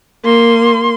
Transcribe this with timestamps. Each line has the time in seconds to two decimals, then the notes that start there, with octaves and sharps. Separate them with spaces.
0.25 A#3 C6